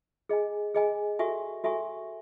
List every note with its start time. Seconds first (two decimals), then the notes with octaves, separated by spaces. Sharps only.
0.29 G#4 D#5 G#5
0.75 G#4 D#5 G#5
1.19 F#4 A4 E5 G#5 C#6
1.64 F#4 A4 E5 G#5 C#6